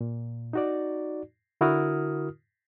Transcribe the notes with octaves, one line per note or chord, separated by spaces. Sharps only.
A#2
D#4 F#4 D5
D3 E4 F#4 A#4 D#6 F6